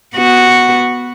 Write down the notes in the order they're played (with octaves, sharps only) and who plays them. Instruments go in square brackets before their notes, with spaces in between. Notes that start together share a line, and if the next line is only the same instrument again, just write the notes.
[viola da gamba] B3 F#4